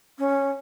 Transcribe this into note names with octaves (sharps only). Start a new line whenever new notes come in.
C#4